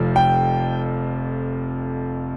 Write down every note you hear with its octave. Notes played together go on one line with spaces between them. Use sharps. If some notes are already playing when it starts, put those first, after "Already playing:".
Already playing: F1 F2 C3 F3
G5